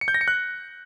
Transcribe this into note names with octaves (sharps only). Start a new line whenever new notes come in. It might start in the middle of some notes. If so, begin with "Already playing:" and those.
C#7
G6
A#6
C#7
F#6